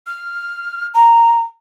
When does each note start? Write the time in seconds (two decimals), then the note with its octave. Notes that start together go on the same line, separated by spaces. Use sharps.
0.07 F6
0.94 A#5